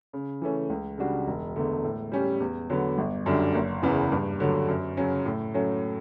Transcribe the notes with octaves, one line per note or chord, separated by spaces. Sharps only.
C#3
E3 A3 C#4
C#2
C#3 G3 D4 F#4
E1
E2 D3 A3
A2
G3 C#4 G4
E2
D3 F#3 B3
G1
F#2 D3 G3 D4
F#1
E2 C#3 E3 B3
G2
D3 F#3
F#2
C#3 F#3 C#4
A2
F#3 A3 C#4